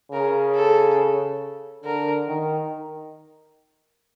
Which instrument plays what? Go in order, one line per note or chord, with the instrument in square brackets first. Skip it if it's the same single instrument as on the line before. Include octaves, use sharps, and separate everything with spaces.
[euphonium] C#3 [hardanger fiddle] A#4
[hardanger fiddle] A4
[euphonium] D3 [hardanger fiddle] A#4
[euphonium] D#3